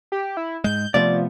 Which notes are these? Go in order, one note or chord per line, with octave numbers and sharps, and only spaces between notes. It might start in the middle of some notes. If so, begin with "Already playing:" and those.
G4
E4
G#2 G#3 G6
C3 F3 A3 B3 D5